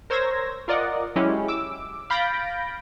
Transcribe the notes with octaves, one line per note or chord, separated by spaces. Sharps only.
A#4 C5 C#5 E6 G#6 A#6
F4 A#4 D5 D#5 F#5
F#3 G#3 C#4 E4 G4
D6 E6
F5 B5 G6 A6 A#6 D7